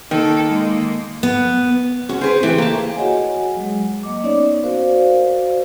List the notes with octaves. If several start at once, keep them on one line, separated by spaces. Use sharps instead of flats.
D#3 A#3 A4
G#3 A#3
B3
C#4 F#4 G#4
C4 G#4 B4 C5
E3 A3 G4 G5
A#3 A5
F#4 G#4 C#5 D#5 F#5 G#5
F#3 G#3
A#3 D#5 D6
B3 C#4 D#4 C#5 D5
F#4 A#4 C5 D5 F5